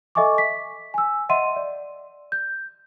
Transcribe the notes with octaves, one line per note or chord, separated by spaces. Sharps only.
A4 D#5 E5 G#5 C#6 D6
B6
G#5 E6
D#5 E5 F#5 C6 D#7
D5
G6